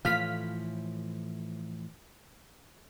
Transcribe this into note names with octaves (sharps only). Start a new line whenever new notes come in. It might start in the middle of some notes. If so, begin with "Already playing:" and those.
A2 E3 F3 F5 F6 B6